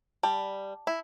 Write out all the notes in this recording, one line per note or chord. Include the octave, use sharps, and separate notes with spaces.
G3 A5
E4